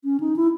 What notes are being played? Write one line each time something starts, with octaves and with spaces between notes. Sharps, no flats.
C#4
D#4
E4